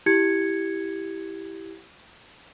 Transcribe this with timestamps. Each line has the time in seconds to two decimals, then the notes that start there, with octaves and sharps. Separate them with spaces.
0.06 E4 G4 G#6 C#7